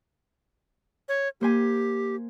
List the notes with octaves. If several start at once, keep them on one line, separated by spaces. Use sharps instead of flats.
C#5
A#3 G4 C5 G#5